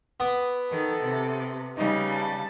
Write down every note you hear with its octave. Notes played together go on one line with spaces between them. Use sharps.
B3 D6
D#3 A4
C3
C#3 G3 D#4
A5